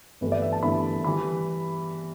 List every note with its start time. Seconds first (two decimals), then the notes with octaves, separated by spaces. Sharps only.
0.21 G1 G2 E3 A3 E4 B4
0.32 D5
0.42 E5
0.52 A5
0.63 G1 G2 E3 A3 E4 B5
1.04 E3 G3 B5